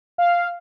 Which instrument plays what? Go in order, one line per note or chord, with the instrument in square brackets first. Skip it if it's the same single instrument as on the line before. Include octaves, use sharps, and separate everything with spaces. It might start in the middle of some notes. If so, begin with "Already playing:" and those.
[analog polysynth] F5